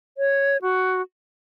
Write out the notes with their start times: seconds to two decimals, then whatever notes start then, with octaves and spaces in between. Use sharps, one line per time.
0.18 C#5
0.62 F#4